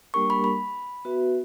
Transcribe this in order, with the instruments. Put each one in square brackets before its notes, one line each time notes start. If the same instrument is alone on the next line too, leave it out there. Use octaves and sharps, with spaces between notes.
[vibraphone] G3 A#3 D4 G4 A#4 [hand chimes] C#6
[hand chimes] B5
B5
[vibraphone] B3 F#4 B4 E5